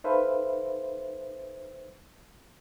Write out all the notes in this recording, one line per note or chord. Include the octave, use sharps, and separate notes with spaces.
D#4 A4 B4 C5 E5 F5